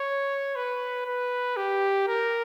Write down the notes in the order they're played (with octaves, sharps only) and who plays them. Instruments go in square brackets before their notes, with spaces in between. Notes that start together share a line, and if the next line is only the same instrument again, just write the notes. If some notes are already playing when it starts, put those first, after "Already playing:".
Already playing: [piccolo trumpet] C#5
B4
B4
G4
A#4